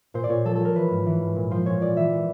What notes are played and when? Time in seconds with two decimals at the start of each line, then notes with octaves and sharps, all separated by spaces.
0.14 A#2 C5
0.24 D5
0.29 A#2 C#5
0.45 F3 A4
0.55 F3 A4
0.65 A#4
0.75 E3 B4
0.91 G#2
1.06 E3
1.21 G#2
1.36 A#2
1.51 F3 C5
1.66 A#2 C#5
1.81 A#2 D5
1.96 E3 E5
2.12 E3